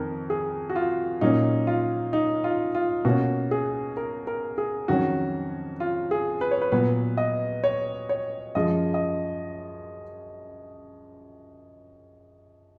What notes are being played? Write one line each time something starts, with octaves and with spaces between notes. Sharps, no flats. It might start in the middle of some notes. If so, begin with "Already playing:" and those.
Already playing: F2 D#3 A#4
G#4
F#4
F4
A#2 F#3 A#3 C#4 D#4
F4
D#4
F4
F4
B2 A#3 C#4 F#4
G#4
A#4
A#4
G#4
F2 D#3 F#3 C#4 F#4
F4
G#4
B4
C#5
B4
A#2 F#3 B3 B4
D#5
C#5
C#5
F#2 F3 G#3 D#5
D#5